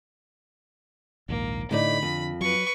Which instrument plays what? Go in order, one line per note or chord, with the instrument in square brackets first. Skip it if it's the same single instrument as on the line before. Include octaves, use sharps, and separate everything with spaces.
[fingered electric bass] A#1 D#2 G#2 [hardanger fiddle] A#3
[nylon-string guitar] A2 D#4 D5 [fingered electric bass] D3 [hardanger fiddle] B5
[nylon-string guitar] F2
[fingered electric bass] F#3 [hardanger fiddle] B4 C#6